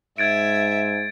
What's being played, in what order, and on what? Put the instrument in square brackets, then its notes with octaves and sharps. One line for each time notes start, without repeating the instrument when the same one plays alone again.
[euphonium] G#2 [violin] E5 [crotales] G#6 A6 D7